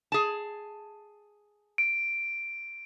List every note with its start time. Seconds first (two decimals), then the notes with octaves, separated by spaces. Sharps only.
0.12 G#4 A5
1.78 D7